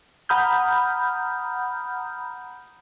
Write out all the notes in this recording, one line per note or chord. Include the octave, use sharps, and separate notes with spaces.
F#5 A#5 B5 D#6 F6 G6